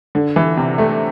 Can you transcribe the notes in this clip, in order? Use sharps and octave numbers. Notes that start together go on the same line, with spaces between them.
D3
E3
C3
A3